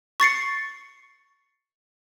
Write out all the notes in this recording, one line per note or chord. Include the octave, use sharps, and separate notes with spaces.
C#6 A6 C7 C#7